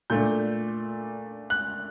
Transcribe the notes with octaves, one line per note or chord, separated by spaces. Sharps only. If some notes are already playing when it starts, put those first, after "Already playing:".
A#2 A3 D4 G6
F#6